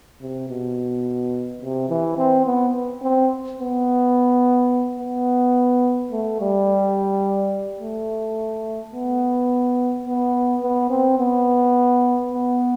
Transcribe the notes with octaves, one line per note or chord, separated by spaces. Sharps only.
C3
B2
C3
E3
C4
B3
C4
B3
B3
A3
G3
A3
B3
B3
B3
C4
B3
B3